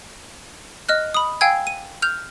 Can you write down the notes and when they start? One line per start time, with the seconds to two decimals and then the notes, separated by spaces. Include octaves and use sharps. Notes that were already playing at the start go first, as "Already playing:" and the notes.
0.89 D#5 F6 F#6
1.14 B5 D#6
1.41 F5 G5 G#5 E6 G#6
1.67 D#7
2.02 F6 G6 F7